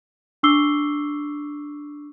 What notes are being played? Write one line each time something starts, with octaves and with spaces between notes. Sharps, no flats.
D4 C#6 D6 E6 C7 G7